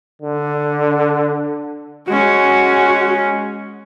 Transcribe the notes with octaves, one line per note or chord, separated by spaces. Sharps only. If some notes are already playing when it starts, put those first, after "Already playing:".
D3
G#3 C#4 F#4